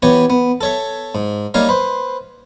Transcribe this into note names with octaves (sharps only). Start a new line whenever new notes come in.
E3 B3 G4 C#5
B3
A4 C#5 E5
G#2
G3 A#3 D#4 C#5 F5
B4 C5